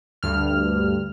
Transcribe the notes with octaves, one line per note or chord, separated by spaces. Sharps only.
D2 G2 F6